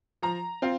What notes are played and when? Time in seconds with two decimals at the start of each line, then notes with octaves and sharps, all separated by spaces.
0.22 F3 A#5
0.62 C4 F4